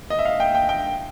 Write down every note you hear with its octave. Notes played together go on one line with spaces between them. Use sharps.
D#5
E5
F5
G5
G5
G5